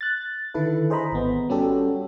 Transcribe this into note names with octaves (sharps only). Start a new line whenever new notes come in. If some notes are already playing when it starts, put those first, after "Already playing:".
F#6 A6
D3 D#3 E4 A4 B4
G#4 C5 D#5 A#5 B5
G#1 B3
G3 C#4 F#4 G4 A4